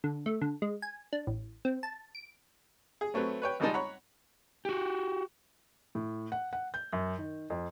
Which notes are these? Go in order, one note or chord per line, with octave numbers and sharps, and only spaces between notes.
D3
A3
D3
G#3
G#5
D4
A1
C4
A5
D7
G#4
F#3 A3 C4 B4 C#5
B4 C#5 G5
G#1 C#2 G3 G#3 D#4 A5
C#5 F#5 A#5 B5
F#4 G4
A2
F#5
F#5
G6
F#2
D#3
F2